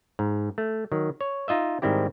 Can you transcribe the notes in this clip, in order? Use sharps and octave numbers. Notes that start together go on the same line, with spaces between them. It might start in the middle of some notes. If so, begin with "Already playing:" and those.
G#2
A3
D#3 F#3
C#5
D#4 F4 D#5 E5
G#2 D#3 G3 C4 E4 G4